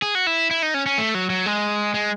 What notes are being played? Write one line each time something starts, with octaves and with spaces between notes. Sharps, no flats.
G#4
F#4
E4
E4
D#4
C#4
C#4
A3
F#3
F#3
G#3
G#3